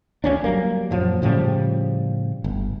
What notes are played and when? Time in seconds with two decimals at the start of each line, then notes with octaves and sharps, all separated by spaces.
0.24 D2 G#3 C#4 D4
0.44 F#3 G3 A#3
0.91 F#2 A#2 F3 F#3
1.22 A2 C#3 F3 G3
2.44 G1